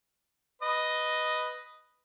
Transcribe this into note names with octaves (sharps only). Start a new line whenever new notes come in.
B4 D#5